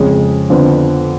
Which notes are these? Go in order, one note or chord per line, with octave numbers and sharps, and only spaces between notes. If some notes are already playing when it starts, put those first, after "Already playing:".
Already playing: F2 C#3 G#3 C#4 G#4
F2 D3 F3 B3